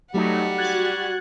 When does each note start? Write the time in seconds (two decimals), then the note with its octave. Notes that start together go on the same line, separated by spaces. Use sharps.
0.14 F#3 G3 A3 D#4 F#5
0.58 F#4 F#6 G#6 A6